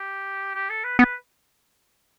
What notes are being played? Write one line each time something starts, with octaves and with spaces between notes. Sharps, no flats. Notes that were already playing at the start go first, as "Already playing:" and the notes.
Already playing: G4
G4
A4
B4
B3 B4